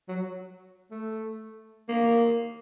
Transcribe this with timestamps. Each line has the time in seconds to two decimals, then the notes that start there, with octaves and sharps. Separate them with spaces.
0.09 F#3
0.91 A3
1.89 A#3